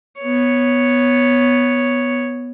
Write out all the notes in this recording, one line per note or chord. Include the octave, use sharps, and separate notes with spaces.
B3 C#5